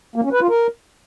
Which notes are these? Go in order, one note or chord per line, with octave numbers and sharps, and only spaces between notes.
A#3
C#4
B4
F4
A#4